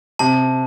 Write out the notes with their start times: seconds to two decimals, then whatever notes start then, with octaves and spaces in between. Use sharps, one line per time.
0.19 C3 A5